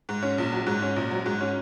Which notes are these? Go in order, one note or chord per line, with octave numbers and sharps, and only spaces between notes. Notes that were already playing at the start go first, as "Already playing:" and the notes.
G#2
C#4
A#1
F#3
G#2
C#4
A#1
F#3
G#2
C#4